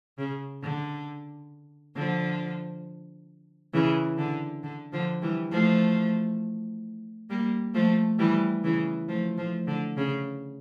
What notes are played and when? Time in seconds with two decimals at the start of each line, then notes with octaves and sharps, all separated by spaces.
0.18 C#3
0.63 D3
1.96 D3 F3
3.73 C#3 E3
4.18 D3
4.63 D3
4.93 D3 F3
5.22 E3 G3
5.51 F3 A3
7.30 G3 A#3
7.74 F3 A3
8.19 E3 G3
8.64 C#3 E3
9.08 F3 A3
9.37 F3 A3
9.67 D3
9.97 C#3